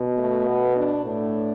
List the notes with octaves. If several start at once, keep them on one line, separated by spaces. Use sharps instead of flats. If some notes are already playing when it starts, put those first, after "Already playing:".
Already playing: B2
A3
B3
D4
A2 D4